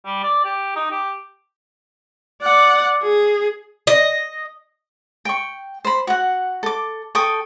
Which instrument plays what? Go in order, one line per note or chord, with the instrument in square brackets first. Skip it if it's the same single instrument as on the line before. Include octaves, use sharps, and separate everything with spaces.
[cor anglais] G3
D5
G4
D#4
G4
[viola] D5 F#5
G#4
[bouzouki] D#5
[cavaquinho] G5 C#6
C5 B5
F#4 F#5
A4 D6
A4 G5 C#6 D#6